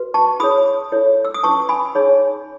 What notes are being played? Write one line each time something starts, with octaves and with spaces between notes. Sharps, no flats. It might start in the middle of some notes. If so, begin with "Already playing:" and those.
Already playing: F#4 B4
A5 C#6
E4 G#4 C#5 B5 D#6
E4 A4 C#5
E6
D#6
C#4 E4 B4 A5 C#6
G#5 B5
D#4 G#4 C#5